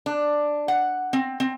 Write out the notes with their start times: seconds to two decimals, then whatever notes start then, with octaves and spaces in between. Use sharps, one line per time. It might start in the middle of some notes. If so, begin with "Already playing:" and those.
0.06 D4
0.68 F#5
1.13 C4
1.40 C4